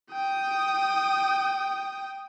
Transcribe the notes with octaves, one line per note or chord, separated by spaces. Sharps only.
G5 D#6